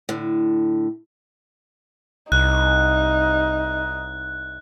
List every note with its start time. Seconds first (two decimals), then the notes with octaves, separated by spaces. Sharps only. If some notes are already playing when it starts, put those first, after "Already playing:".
0.09 A2 D3
2.32 C2 D#4 F#6